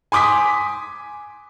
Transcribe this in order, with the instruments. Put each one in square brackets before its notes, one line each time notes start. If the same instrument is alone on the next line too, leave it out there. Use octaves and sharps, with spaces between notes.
[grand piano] G#5 C6 D6 D#6 B6